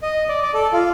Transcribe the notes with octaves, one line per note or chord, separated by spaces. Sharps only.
D#5
D5
D5
A4
F4